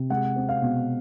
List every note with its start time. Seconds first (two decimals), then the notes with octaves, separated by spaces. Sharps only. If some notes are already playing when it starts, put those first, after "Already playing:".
Already playing: C3
0.10 G#3 F#5
0.36 C4
0.49 F5
0.62 B2